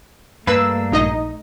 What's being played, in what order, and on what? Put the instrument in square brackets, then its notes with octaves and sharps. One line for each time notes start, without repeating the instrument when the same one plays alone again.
[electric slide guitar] G2 A#3 D4 [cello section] A3 [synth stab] B4 E6
[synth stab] A#1 D#4 D#5